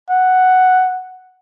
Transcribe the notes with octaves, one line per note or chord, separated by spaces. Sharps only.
F#5